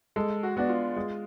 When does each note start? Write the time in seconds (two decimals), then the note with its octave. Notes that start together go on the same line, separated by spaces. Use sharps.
0.16 G#3 A4
0.43 F#4
0.57 B3 D4 F#4
0.69 F4
0.96 G#3